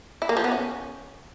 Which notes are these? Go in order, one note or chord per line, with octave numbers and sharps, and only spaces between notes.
E4
A#3
F3
B3
C#4